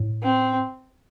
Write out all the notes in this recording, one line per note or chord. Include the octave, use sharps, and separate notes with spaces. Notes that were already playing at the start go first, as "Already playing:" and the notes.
Already playing: A2
C4